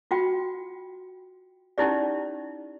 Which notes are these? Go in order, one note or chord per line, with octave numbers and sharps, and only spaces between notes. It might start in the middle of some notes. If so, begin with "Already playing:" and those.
F4 F#4 G5
C#4 D#4 E4 G4 D5